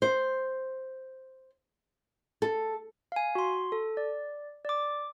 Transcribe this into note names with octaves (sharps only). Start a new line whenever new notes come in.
C5
A4
F5 G#5
F#4 C6
A4
D5
D5 D6